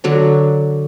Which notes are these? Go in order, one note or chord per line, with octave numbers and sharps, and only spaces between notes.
D3 F#3 D4